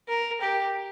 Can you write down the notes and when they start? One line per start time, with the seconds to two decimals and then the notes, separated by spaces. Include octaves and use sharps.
0.08 A#4
0.42 G4